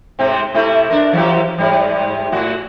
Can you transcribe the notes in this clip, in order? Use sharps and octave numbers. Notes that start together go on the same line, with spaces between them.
G#2 C3 C4
C3 A3 E4
D4 A#4
E3 F#3 G4
G#2 G3
A2 F#4